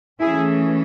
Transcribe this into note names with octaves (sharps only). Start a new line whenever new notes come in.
E3 A3 C#4 E4 G#4